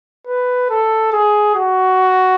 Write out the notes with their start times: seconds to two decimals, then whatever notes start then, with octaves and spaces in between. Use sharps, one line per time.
0.27 B4
0.70 A4
1.12 G#4
1.55 F#4